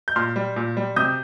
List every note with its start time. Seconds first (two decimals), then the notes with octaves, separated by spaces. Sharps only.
0.08 G6
0.16 A#2 C6 F6
0.36 G3
0.56 A#2
0.77 G3
0.96 C3 D#6 G6